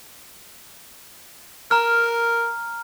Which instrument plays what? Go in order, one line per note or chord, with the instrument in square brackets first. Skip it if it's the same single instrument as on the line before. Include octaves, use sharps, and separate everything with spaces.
[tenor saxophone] A#4 [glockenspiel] A#5 F6